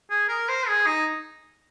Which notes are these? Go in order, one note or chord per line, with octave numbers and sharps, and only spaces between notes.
G#4
A#4
C5
G#4
D#4